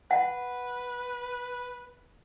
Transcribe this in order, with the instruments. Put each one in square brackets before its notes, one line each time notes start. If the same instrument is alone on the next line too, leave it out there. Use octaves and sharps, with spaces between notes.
[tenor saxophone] B4 [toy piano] F#5